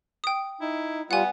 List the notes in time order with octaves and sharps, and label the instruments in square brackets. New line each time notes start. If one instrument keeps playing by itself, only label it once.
[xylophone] G5 D#6
[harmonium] D#4 [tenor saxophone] E4
[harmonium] G3 F4 [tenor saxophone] B3 [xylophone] F#5 G#5